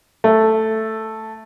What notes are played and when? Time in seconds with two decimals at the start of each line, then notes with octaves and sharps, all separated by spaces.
0.24 A3